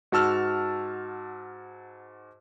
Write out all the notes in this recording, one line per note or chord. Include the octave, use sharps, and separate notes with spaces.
G#2 F#4 A5 E6 F6